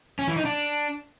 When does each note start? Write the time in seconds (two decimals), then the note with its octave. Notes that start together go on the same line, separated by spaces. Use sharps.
0.19 C#4
0.28 E3
0.36 D#4
0.45 D4